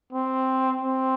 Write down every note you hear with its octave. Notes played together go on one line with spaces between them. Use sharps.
C4
C4